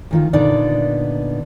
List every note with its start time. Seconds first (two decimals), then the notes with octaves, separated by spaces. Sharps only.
0.11 D2 D#3 F4
0.33 A#2 D3 B3 D#4 D5